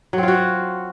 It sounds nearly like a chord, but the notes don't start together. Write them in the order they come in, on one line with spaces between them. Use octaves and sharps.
F#3 C4 F4 F#4